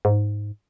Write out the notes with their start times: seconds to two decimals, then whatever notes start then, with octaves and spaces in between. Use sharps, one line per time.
0.05 G#2